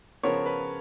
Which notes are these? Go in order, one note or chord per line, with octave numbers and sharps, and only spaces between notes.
C#3 F3 B3 A#4 C#5
B4